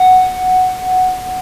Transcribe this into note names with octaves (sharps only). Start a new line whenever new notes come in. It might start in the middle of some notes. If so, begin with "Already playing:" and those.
Already playing: F#5